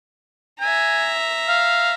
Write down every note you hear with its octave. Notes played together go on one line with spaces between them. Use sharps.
E5 G#5 A#5
F5